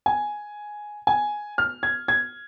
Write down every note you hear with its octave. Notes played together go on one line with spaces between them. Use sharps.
G#5
G#5
F6
G#6
G#6